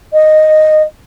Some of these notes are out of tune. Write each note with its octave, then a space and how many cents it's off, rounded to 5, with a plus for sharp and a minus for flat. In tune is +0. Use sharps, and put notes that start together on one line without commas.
D#5 -5